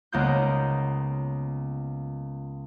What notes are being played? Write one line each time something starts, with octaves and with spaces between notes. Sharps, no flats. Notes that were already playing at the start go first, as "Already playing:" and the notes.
C#2 A#3 B3 F4 D#6 G6